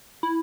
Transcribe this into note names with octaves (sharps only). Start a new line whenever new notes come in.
E4